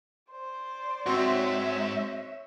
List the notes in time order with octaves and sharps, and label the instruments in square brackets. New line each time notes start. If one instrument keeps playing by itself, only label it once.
[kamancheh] C5 D5
[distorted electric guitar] G#2 [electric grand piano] C4 F#4 [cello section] C#5 E5